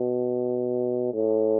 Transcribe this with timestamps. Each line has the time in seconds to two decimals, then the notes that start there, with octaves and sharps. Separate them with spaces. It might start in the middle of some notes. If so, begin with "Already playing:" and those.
Already playing: B2
1.13 A2